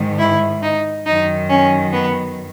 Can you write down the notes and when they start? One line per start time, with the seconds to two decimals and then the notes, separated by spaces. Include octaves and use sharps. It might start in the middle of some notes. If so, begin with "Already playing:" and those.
Already playing: G#2 D#3
0.19 E4
0.62 D#4
1.06 F#2 D#3 D#4
1.50 C#4
1.92 B3